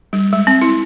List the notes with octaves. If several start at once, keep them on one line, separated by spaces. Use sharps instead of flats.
G3
G#3
C4
E4